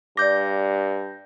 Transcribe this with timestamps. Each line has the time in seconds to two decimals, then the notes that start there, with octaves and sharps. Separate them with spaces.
0.17 G2 D5 D6 G6 A#6